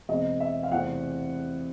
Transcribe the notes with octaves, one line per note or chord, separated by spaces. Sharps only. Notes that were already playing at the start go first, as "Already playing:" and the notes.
E2 B2 G#3 C4 D#5
E5
F5
E2 C3 E3 A3 C4 F#5